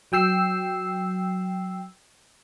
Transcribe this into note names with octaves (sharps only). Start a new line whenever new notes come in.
F#3 G5 E6 C7